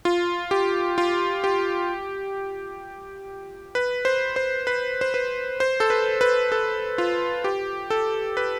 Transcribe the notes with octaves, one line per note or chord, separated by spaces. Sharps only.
F4
G4
F4
G4
B4
C5
C5
B4
C5
B4
C5
A4
B4
B4
A4
F4
G4
A4
B4